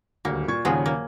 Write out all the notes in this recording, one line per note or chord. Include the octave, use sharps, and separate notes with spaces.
D#1 D2 A#3
A#2 C#6 G#6
D#2 A#2 C#3 F3 F#3 G#4
A#3